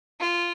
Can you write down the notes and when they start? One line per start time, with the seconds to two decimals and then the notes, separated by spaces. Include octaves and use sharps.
0.20 F4